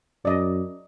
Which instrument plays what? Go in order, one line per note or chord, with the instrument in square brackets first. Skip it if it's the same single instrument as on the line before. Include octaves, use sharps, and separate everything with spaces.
[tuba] F#2 [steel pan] D5 D#5